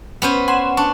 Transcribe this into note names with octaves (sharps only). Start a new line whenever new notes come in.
B3 C#4 C5
F#5 G#5 C6 E7
D4 C#6